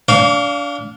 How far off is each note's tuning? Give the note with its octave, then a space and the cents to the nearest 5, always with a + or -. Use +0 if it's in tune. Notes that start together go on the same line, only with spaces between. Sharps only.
D4 -30 F5 +0 C#6 +45